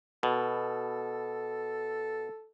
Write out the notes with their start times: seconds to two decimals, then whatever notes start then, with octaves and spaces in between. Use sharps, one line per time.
0.23 B2 A4